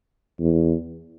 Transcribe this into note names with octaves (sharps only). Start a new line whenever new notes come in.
E2